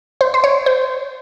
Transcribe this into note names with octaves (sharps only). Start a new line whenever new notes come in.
C5
C5
C#5
C5